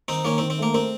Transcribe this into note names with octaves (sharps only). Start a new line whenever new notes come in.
D#3 C4 D#4
D#3 A#3 C#4
D#3 C4
C4
A3 A#3
C4 A#4